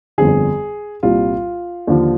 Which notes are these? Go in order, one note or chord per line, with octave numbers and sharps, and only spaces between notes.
G1 F2 D3 G#4
C2 A#2 G3 F4
D#2 D3 F3